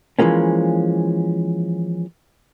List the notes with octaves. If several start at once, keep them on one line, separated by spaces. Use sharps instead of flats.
E3 F3 G#3 A#3 C#4